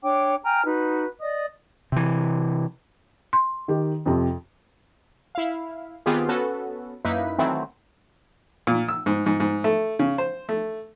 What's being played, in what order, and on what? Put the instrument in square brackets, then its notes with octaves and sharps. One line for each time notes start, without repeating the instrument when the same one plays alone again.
[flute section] D4 C#5 G5 D6
G5 G#5 A#5 F6
D#4 F#4 B4
D5 D#5 D#6
[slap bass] C3 E3
[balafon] C6
[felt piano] D#3 G4
F2 C3
[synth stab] E4 F5
D#3 B3 C4 F4 G4 G#4
B3 C#4 F#4 A4 B4
F#2 A#3 D#4 E4 B4 B6
D#3 E3 F#3 A3 C4 E4
[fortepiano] A#2
E6
G#2
G#2
G#2
A3
C#3
C5
A3